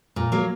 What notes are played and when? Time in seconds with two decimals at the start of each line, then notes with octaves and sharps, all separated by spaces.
0.16 A#2
0.32 F#3 A#3